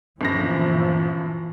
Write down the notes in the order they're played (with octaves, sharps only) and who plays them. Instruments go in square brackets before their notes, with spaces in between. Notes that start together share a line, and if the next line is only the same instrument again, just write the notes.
[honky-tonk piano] G1 F#2 A#6 [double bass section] A#2 E3 F3